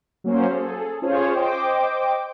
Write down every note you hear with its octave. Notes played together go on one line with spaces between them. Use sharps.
F#3 A#3 C#4 C5
G#4 A4
C#4 F4 G#4 C5 C#5
C5 D#5 G5 D6